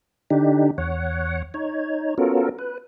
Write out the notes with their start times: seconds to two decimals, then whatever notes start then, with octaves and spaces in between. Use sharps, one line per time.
0.30 D3 D4 D#4 G4
0.78 E2 C#5 F#5
1.54 D#4 C#5
2.18 B3 C#4 F4 F#4 A4 A#4
2.59 B4